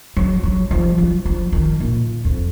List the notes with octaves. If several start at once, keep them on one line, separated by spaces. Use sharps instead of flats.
F#3
F#3
F3
F#3
F3
D#3
A#2
F2